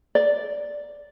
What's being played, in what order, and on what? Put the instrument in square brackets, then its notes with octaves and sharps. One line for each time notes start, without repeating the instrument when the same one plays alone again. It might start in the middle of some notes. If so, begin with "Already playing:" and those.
[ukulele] D5